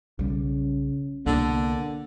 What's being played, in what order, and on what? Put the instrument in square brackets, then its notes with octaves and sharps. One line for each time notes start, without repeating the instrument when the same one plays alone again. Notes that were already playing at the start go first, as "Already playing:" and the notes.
[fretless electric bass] B1 G3 [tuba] C#3
[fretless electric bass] C2 B2 [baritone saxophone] D3 [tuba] A#3